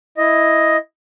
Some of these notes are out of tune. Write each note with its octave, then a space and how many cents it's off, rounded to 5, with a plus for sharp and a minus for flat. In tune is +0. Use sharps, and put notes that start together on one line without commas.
E4 +0 D#5 +5